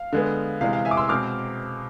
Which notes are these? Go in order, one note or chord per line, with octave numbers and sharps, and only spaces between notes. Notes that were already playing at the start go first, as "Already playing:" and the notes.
Already playing: F5
D3 G#3 B3
C3 E3 G#3 F5
F5
E5 G#5
D6
C6 E6
B2 G#3 C4 D6 F6